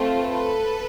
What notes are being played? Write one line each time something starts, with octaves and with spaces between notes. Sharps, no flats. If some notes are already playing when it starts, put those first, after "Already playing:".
Already playing: A3 C4 F4
A4 B4